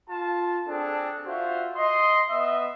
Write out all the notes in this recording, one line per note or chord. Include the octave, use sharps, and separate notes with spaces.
F4 A5
C4 D4 G#4 A4
F4 F#4 C5 E5
D#5 C6
B3 D#5 E5